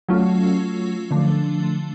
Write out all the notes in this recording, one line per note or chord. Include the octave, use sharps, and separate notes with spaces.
F#3 A3 C#4 F4
D3 F3 A3 D4